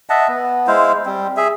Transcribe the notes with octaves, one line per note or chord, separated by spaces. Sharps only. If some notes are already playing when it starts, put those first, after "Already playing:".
D#5 E5 F#5 A5
B3
G#3 E4 C5 F5
G3 C4
G#4 E5